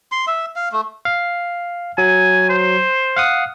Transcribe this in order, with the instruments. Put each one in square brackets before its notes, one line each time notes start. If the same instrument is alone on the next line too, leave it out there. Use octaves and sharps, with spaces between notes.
[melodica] C6
E5
F5
A3
[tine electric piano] F5
[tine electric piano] F#3 [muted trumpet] G#5
[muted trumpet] C5
[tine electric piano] F5 F#5 D#6